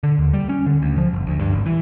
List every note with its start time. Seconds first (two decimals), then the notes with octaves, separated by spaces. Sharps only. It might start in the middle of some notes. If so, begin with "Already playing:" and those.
0.03 D3
0.19 D#2
0.33 G3
0.49 C#4
0.66 D3
0.82 D2
0.98 F3
1.13 F#1
1.27 D2
1.39 G2
1.53 G#1
1.66 E3